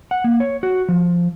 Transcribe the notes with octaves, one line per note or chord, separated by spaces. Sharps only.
F#5
A#3
C#5
F#4
F3